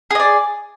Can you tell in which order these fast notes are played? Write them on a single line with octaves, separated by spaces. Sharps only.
G#4 D#5 D5